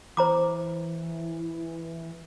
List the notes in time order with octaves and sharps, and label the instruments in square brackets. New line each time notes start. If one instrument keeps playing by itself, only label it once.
[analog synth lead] E3 [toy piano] C5 A#5 D6